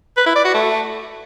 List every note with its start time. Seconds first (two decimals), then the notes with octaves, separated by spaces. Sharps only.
0.17 B4
0.26 E4
0.35 D5
0.45 F#4
0.54 A3